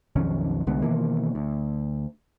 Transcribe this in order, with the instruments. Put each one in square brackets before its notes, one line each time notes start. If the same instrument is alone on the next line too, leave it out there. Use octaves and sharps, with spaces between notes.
[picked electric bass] B1 F2 D#3 C#4
C2 D3 G#3 B3
B2 D#3 E3 A#3
D2